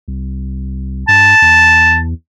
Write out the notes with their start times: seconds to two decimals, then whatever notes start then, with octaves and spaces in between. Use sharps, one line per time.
0.08 C2
1.08 G2 A5
1.42 E2